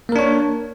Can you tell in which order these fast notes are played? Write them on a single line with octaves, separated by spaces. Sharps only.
A#3 A#4 D4 C#5